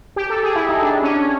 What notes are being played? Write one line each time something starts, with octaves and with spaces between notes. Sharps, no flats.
G4
A4
G#4
E4
D#4
D4
C#4
C#4